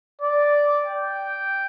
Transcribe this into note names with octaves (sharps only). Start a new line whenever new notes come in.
D5
G5